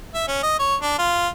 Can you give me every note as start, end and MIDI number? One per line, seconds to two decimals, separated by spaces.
0.14 0.23 76
0.28 0.41 61
0.43 0.58 75
0.59 0.75 73
0.81 0.96 62
0.98 1.28 65